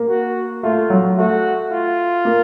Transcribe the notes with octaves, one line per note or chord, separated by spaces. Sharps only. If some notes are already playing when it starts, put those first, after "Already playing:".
Already playing: A#3
F#4
A3 F4
F#3
A3 F#4
F4
A#3